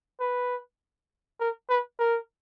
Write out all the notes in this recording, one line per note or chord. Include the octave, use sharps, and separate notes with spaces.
B4
A#4
B4
A#4